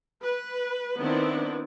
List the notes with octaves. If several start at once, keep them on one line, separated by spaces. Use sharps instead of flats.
B4
D#3 B3 C4 D4 E4